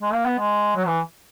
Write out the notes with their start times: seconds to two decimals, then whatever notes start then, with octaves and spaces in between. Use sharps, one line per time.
0.02 G#3
0.13 A#3
0.26 B3
0.38 G#3
0.76 F#3
0.87 E3